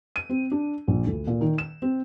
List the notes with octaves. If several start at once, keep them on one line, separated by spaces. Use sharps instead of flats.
D#7
C4
D4
A#1
D2
A#2
D#3
E7
C4